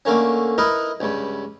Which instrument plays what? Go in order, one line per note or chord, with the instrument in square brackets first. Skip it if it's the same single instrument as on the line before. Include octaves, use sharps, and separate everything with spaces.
[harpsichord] D3 A3 A#3 C#4
D#4 E4 A#4 B4 D#5
C#2 G2